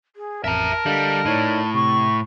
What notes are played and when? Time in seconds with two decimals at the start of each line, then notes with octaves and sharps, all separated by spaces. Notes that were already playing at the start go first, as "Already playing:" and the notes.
0.16 G#4
0.44 A1 F2 A#4 E5 A5 A#5
0.86 D3 G3 D#5 F5
1.26 A2 D#4 C#5 D5
1.74 C3 C#6